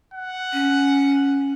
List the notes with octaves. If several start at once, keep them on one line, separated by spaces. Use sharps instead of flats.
F#5
C#4